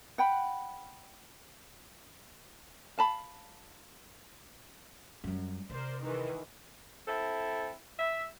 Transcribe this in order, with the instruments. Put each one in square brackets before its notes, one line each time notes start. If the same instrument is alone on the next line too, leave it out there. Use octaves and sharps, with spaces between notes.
[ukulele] F#5 G5 B5
F5 A5 B5
[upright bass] F#2 G3
[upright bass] C3 [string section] A#4 C5 D5
[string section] D#3 E3 G#3
[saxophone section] C4 E4 A4
E5